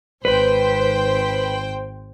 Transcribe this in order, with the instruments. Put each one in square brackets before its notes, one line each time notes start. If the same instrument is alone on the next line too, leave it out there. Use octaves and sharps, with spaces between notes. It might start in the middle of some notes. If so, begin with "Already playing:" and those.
[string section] G#1 C5 G5 [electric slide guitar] B4